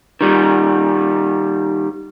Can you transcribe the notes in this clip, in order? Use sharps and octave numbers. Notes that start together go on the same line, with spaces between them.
D#3 G3